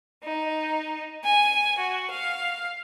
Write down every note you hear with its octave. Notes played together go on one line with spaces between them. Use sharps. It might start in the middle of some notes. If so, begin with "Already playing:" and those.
D#4
G#5
F#4
F5